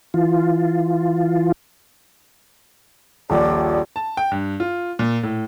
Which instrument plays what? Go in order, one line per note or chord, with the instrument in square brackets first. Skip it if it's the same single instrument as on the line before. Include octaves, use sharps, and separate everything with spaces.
[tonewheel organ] E3 F4
[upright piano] D#1 A#1 [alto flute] D5
[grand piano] A5
G5
G2
F4
A#2
A2